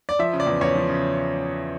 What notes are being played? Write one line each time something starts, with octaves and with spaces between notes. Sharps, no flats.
D5
F3 E5
C#3
D5
E2
E2 C#5
F3
C#3